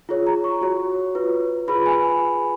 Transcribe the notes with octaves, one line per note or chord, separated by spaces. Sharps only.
F4 G#4 C#5
A#5
C#6
F#4 C#5
F4 B4
F4 G#4 B4 B5
G#5